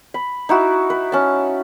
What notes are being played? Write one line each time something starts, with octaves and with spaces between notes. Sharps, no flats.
B5
D#4 E4 F#4
B4
C#4 A5